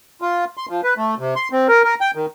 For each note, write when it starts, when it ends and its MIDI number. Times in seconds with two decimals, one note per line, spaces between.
0.22 0.45 65
0.57 0.66 84
0.69 0.81 53
0.84 0.94 71
0.97 1.15 57
1.19 1.34 48
1.36 1.48 84
1.52 1.68 60
1.69 1.84 70
1.84 1.95 70
2.01 2.11 79
2.15 2.26 51